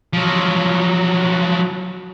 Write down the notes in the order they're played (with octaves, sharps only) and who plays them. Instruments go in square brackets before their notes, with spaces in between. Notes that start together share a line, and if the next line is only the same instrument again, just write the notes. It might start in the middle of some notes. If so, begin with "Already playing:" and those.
[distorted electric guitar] F3 F#3